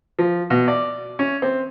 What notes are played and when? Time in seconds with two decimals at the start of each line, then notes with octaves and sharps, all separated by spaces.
0.19 F3
0.50 B2
0.68 D5
1.19 C#4
1.42 C4